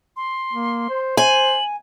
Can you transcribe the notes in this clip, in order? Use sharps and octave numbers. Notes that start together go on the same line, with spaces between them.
C6
A#3
C5
C5 G#5 F#7